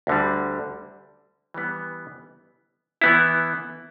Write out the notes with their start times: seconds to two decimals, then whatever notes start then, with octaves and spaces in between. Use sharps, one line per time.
0.07 D2 D3 G3
1.54 E3 G3 B3
3.02 E3 B3 E4